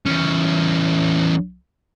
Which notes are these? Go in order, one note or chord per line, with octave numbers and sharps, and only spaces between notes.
E2 C#4